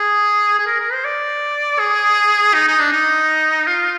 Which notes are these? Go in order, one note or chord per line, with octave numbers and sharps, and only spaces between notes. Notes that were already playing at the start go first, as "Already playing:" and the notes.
Already playing: G#4
G#4
A#4
A#4
C5
D5
G#4
D#4
D#4
D4
D#4
F4